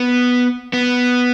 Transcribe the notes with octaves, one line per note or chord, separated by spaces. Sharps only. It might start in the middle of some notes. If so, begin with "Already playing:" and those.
Already playing: B3
B3